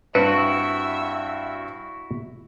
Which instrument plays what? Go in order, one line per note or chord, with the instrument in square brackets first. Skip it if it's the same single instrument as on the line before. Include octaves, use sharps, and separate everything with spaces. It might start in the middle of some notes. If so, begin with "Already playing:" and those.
[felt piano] G2 C4 [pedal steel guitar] E4 F#4 [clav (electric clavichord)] B4 [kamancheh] E5